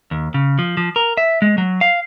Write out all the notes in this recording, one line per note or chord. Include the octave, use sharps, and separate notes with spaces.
D#2
C#3
F3
F3
A#4
E5
G#3
F#3
F5